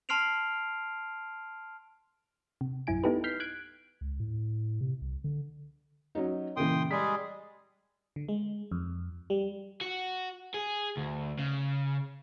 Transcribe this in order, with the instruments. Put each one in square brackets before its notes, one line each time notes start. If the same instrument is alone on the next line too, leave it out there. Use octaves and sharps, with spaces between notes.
[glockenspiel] A5 C6 F6 C7 D7 F7
[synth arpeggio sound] C3
A#1 F#2 E4 G#5 D7
B3 D#4 E4 G4 A4 B4
F6 G6 B6 C7
F#6 G#6 D7
[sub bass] C#2
A2
C3
C2
D3
[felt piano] F#3 C#4 D#4
[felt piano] A#2 C#3 E3 [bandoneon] G5 C6 D#6
[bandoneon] G3 G#3 G#4 [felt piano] B6
[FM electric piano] D3
G#3
F2
G3
[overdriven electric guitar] F#4
G#4
D2
C#3